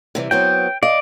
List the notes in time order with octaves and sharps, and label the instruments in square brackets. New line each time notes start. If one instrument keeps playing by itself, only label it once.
[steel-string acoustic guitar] C3 E3 G3
[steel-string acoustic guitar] F#3 B3 C4 [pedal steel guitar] G5
[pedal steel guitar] D5 [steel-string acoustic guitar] D#5 F5